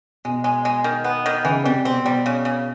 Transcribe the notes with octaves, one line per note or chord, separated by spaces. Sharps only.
B2 G#3
G#3
G#3
D#3
B3
D#3
C#3 E3
C3 G3
B2 C4
B2 G3
C#3
C#3